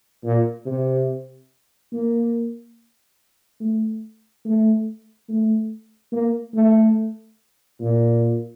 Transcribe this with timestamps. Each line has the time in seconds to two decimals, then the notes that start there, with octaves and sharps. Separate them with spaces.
0.24 A#2
0.66 C3
1.93 A#3
3.60 A3
4.45 A3
5.29 A3
6.12 A#3
6.54 A3
7.81 A#2